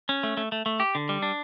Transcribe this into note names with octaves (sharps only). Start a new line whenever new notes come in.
C#4
A3
A3
A3
A3
G4
D3
G3
D4